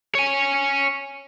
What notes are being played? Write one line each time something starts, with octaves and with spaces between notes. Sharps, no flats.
C#5 G#5